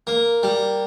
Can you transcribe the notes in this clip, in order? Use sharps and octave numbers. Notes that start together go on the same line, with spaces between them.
A#3
G3